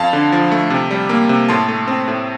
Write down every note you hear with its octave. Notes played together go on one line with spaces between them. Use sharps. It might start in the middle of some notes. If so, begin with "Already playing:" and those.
Already playing: F2 F5 A5
D3
F3
A3
C3
G3
A#3
C3
A2 A5 C6
A3
C4
A2